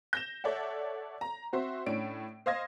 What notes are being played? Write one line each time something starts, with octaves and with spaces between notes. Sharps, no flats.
G6 A#6 E7
A4 C#5 D5 E5 F#5
A#5
C4 F#4 C5 E5
A2 C#4 D4 D7
C5 D#5 F5 D#6 G#6 A#6